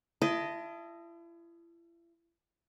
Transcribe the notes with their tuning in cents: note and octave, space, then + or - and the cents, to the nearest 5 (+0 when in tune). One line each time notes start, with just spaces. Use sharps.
E4 +40 D#5 +0 A5 +0